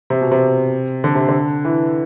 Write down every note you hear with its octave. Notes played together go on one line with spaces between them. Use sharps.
C3
B2
C3
D3
C3
D3
E3